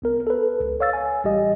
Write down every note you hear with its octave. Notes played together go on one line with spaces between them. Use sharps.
C2 B3 A#4
A4 B4
C#2
C#5 F5 E6 A6
G#5
A1 G3 G4 D#5